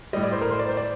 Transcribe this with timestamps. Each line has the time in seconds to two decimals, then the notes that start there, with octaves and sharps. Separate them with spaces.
0.13 A2 G3 D#5
0.23 D5
0.32 C5
0.41 A#4
0.51 C5
0.60 D5
0.68 C5
0.77 D5